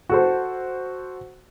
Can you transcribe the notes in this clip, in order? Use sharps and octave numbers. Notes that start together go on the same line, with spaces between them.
F#4 A4 C5